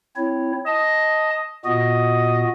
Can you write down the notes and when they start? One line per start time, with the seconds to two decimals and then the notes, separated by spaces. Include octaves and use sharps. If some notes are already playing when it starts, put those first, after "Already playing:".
0.17 C4 E4 C#5
0.66 D#5 A5
1.65 A#2 B3 F#4 D#5